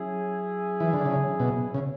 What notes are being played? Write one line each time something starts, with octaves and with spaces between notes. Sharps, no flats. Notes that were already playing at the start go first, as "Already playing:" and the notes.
Already playing: F#3 C#4 E4 G#4
E3
D3
C#3
B2
C#3